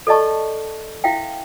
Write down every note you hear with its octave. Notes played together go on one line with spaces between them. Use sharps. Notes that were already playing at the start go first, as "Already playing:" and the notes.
A4 D5 D#5 A5 C#6
E4 E5 F5 G5